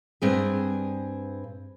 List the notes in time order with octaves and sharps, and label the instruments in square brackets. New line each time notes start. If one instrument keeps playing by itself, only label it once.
[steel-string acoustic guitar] G2 C4 G#4